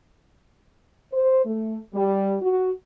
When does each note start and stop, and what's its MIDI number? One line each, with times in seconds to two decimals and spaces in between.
1.13 1.45 72
1.45 1.78 57
1.94 2.35 55
2.41 2.71 66